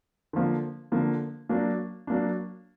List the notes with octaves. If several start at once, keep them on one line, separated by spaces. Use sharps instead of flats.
D3 F3 A#3
D3 F3 A#3
F#3 A#3 D4
F#3 A#3 D4